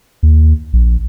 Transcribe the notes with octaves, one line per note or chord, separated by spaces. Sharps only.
D#2
A#1